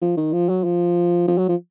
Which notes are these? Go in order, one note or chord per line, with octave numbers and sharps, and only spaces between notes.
F3
D#3
F3
F#3
F3
F3
F#3
F3